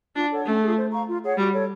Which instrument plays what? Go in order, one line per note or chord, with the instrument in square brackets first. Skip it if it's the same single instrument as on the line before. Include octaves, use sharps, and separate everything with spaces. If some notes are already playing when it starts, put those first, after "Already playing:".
[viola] D4 [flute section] F4
[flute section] A4 C#5 F#5
[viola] A3 [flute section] C#4
[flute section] F4 G#4
C5
F5 A#5 C#6
F4
G#4 C#5 F#5
[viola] G3 [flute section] F#4
[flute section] A4 C#5